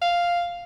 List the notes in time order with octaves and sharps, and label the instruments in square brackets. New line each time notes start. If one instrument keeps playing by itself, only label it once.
[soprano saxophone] F5